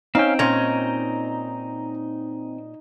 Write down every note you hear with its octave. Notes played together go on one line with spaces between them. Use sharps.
C4 C#4 D#4 F5 G5
A#2 C#4 D#5 A#5